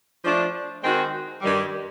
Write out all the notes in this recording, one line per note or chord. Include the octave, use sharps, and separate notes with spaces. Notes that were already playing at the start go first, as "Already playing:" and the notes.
F3 A3 D4 F4
D#3 G#3 C4 D#4 F#4
G2 D#3 G3